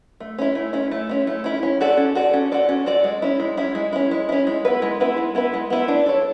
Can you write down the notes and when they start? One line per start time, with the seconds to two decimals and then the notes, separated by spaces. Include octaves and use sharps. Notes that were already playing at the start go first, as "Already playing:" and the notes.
0.20 A3
0.38 C#4 E4
0.55 A3
0.73 C#4 E4
0.91 A3
1.09 C#4 E4
1.27 A3
1.44 C#4 E4
1.63 C#4
1.81 F#4 A4 D5
1.97 C#4
2.15 F#4 A4 D5
2.34 C#4
2.52 F#4 A4 D5
2.69 C#4
2.86 F#4 A4 D5
3.04 G#3
3.22 C#4 E4
3.40 G#3
3.57 C#4 E4
3.75 G#3
3.93 C#4 E4
4.11 G#3
4.29 C#4 E4
4.47 G#3
4.65 B3 E4 B4
4.82 G#3
5.00 B3 E4 B4
5.17 G#3
5.35 B3 E4 B4
5.54 G#3
5.70 B3 E4 B4
5.88 D4
6.06 A4 C#5